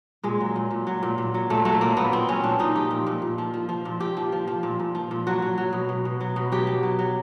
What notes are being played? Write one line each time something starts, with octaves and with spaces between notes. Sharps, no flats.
A#2 G#3
F#3
A#2
A#2
F#3
A#2
A#2
F#3
A#2 A3
F#3 A3
A#2 A#3
A#2 B3
A#2 C4
F#3 C#4
A#2 D4
A#2 D#4
F3 G4
A#2
A#2
A#2
F3
F3
F3
A#2
A#2 G4
F3
F3
F3
A#2
A#2
F3
A#2
F#3 F#4
F#3
F#3
B2
B2
B2
F#3
B2
F#3 G4
B2
F#3
F#3